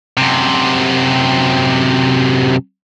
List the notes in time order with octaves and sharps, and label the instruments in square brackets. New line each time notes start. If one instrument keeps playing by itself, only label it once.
[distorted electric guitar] F#2 C3